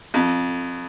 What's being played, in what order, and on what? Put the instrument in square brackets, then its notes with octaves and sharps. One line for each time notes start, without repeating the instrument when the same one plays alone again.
[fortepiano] F2